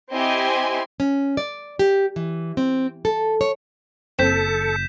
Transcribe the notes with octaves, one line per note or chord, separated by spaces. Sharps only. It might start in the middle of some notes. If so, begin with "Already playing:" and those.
C4 E4 G4 D#5 G#5 C6
C#4
D5
G4
E3
C4
A4
C#5
F#1 C4 A4 G6 B6 E7